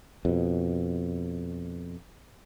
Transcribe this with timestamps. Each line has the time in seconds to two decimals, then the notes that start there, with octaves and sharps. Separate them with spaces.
0.25 F2 B2